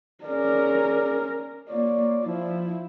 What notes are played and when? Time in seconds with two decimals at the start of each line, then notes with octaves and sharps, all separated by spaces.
0.24 C#4 G#4 A#4 D5
1.69 A#3 F4 C#5 D5
2.26 F3 E4